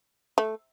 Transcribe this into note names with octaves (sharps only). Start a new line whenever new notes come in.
A3